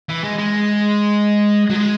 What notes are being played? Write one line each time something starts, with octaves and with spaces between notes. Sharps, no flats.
E3
G#3
G#3
F#3
G#3